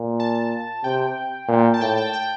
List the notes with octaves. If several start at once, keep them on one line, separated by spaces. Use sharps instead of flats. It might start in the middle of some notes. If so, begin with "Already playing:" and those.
Already playing: A#2
A5
C3 G5
A#2
A5
A2 G5
G5
G5